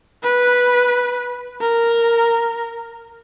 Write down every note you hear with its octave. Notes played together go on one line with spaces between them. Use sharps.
B4
A#4